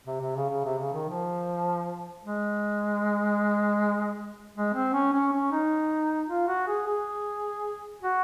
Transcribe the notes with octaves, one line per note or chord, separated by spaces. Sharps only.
C3
C3
C#3
C#3
C3
C#3
D#3
F3
G#3
G#3
C4
C#4
C#4
C#4
D#4
F4
F#4
G#4
G#4
F#4